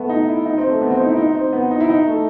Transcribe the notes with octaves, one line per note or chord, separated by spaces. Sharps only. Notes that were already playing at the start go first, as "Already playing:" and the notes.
Already playing: A3 B3
D#4
E4
D#4
C4
A3
B3
C4
D#4
E4
D#4
C4
B3
D#4
E4
D#4
A3